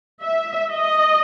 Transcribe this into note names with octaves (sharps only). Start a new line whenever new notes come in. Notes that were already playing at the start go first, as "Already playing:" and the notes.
E5
D#5